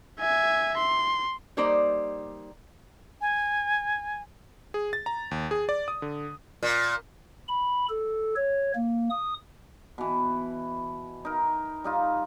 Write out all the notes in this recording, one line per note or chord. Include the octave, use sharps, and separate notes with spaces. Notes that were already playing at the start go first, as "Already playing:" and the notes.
E5 G#5
C6
G3 A#3 D#4 C5 D5
G#5
G#4
A6
A#5
D#2
G#4
D5
D#6
D3
A#2
B5
A4
C#5
A#3
D#6
B2 E3
D#4 A#4
G3 D#4 F4